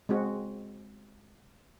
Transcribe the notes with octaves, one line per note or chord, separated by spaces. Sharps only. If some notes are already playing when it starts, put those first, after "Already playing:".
G#3 C4 F#4